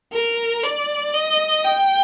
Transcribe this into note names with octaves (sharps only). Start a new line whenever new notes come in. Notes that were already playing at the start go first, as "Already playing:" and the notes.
A#4
D5
D#5
G5